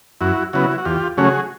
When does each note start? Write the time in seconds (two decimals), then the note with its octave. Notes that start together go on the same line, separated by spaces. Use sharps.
0.21 F#2 E4 F#4
0.53 C#3 F#3 B3 E4 F#4
0.78 F#4
0.85 E2 F4 G4
1.17 C#3 F#3 A3 C#4 F#4 G#4